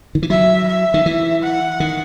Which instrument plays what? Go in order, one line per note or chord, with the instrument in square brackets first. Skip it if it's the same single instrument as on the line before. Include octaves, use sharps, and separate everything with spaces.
[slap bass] D#3
E3
[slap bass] F#3 [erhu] E5
[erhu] E5
[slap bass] D#3
E3
[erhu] F#5
[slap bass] D#3